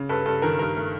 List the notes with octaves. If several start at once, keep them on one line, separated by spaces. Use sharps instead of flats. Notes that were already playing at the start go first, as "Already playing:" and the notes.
Already playing: C#3
G2 A4 B4
G2 A4
D#3 A#4
G2 A#4
A3